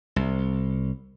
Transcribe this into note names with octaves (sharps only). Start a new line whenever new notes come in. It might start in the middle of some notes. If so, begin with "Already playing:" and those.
C2